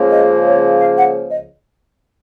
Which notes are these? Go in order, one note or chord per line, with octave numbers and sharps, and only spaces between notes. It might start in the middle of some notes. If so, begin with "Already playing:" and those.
Already playing: C#2 C#3 F3 A#3
D#5
C#5
F5
F#5
D#5